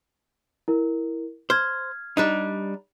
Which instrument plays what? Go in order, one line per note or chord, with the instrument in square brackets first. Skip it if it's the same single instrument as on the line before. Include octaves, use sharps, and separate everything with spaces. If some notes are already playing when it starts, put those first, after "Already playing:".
[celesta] E4 A#4
[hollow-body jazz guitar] C5 [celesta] F6 G#6
[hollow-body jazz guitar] G3 D4 D#4